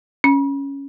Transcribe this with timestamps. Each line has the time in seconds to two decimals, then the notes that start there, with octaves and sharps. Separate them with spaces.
0.24 C#4